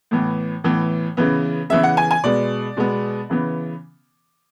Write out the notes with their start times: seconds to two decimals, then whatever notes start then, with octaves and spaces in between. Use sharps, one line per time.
0.11 A2 E3 B3
0.64 A2 E3 B3
1.17 C#3 E3 B3
1.70 C#3 E3 B3 E5
1.83 F#5
1.97 G#5
2.11 G#5
2.23 B2 G#3 B3 D5
2.77 B2 G#3 B3
3.30 C#3 E3 B3